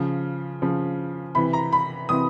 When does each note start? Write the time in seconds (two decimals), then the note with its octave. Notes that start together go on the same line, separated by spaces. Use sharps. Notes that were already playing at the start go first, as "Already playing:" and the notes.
Already playing: C#3 F3
0.62 C#3 F3
1.35 C3 E3 B5
1.53 A#5
1.72 B5
2.09 C3 E3 D#6